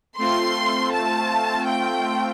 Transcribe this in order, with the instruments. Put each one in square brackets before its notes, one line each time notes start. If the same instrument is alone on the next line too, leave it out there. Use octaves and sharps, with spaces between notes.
[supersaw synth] A3 C4 F4 [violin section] C6
[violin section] A5
G5